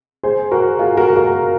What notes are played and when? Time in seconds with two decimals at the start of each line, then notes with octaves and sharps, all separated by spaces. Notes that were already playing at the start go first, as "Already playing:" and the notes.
0.23 G#4 C5
0.51 F#4 A#4
0.79 F4 G#4
0.97 F#4 A#4
1.16 F#4 A#4